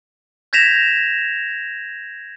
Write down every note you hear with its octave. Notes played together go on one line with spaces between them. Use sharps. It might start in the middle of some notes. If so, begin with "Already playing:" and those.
G6 G#6 A#6 B6 E7 F7